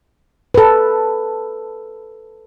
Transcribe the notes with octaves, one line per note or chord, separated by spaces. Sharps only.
A4 B4